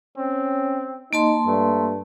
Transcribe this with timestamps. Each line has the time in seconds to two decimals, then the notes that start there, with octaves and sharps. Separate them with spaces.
0.17 C4 C#4
1.13 A#3 D#4 A5 C6
1.47 G2 A3